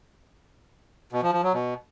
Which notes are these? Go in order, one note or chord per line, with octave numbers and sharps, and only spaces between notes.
B2
F3
F3
F#3
B2